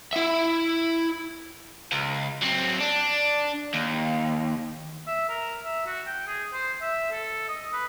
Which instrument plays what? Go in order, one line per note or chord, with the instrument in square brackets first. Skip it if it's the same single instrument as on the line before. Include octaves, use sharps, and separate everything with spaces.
[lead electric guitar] E4 E5
[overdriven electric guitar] C#2
F#3 C4
D4
D#2
[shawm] E5
A#4
E5
F#4
G5
G#4
C5
E5
A4
D#5
B4